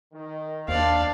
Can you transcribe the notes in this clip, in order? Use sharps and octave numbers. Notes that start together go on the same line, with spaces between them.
D#3
D#2 D4 C5 D5 F5